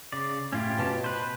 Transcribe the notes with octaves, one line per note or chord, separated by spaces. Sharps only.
C#3 D5
A2 C#4 F4 G4
B2 A5
B4 C5